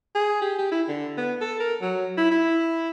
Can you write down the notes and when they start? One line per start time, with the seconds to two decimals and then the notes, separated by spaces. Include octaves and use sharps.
0.15 G#4
0.42 G4
0.58 G4
0.71 E4
0.88 D3
1.17 B3
1.41 A4
1.60 A#4
1.82 F#3
2.18 E4
2.31 E4